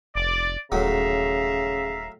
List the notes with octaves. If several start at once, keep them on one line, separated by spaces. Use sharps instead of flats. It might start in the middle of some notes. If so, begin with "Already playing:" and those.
F1 D5
D#1 A2 C#3 F#3 G#3 E5 F5 A#5